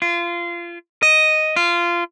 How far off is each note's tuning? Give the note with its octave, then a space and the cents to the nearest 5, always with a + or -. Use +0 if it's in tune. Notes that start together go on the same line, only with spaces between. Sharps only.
F4 -25
D#5 +0
F4 -20